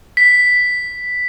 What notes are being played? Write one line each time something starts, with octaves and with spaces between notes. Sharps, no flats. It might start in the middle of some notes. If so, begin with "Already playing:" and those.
B6